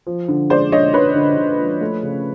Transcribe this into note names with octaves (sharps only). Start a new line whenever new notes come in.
F3
D3
G#3 C5 D5
D3 C#5 D#5
D3 B4 C#5
D3
D3
F3
A3
C#3